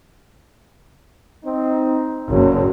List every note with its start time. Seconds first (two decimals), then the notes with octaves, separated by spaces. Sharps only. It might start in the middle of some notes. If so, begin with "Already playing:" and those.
1.44 C4 D#4
2.30 F#1 F#3